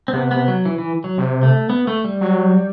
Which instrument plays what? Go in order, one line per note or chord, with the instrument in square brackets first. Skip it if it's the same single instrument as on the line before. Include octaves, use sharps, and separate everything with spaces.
[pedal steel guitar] C4
[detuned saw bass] C3 [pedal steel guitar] B3
[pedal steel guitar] B3
F#3
E3
E3
F#3
[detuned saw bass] C3
[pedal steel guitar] A3
B3
A3
G3
[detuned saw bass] F#3